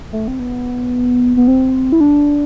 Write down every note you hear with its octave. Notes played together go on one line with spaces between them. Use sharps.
A3
C4
B3
B3
C4
E4
D4